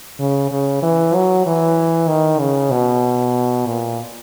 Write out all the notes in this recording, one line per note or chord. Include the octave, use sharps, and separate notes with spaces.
C#3
C#3
E3
F#3
E3
D#3
C#3
B2
A#2